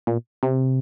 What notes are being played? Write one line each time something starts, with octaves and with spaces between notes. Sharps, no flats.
A#2
C3